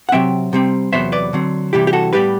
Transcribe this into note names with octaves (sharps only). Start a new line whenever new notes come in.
F#5
C3 F#3 C4 E5 G5
C3 G3 C4
E2 C3 F#3 B3 C5 E5
B4 D5
D3 F#3 C4
C3 E3 G3 E4 G4
G4
F#4 A4
A2 G3 B3 G4 B4